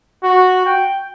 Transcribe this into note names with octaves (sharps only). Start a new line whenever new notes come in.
F#4
G5